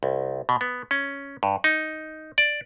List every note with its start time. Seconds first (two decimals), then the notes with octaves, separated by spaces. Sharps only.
0.03 C2
0.49 B2
0.61 B3
0.91 C#4
1.43 G2
1.64 D#4
2.38 D5